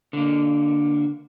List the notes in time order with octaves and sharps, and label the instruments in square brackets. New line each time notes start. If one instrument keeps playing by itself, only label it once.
[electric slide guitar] D3 A#3